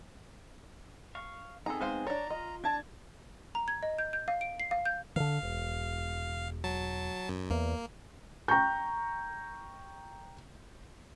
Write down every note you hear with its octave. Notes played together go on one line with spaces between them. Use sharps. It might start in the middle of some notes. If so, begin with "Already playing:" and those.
F5 C#6
B3 C4 D#4 G#4 A4 A#5
G#3 C5 F5
D4 C#5 D5 A#5
F4 D#5
D4 D5 A5 G#6
A#5
G#6
D#5
G6
G6
F5
D7
C7
F5
G6
D3 D#3 F5
E1
F#3 A5
F#2
E2 A#3
G5 A#5 C#6 G6